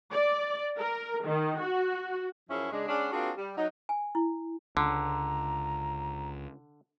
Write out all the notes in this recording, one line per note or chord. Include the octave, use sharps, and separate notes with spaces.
D5
A#4
D#3
F#4
F#2 F3 C#4 E4 G#4
C#3 G#3 D4
G#3 B3 C#4 D4
A#3 C4 D4 F4 F#4 G#4
G3
F#3 D#4
G#5
E4
C#2 D3 A#5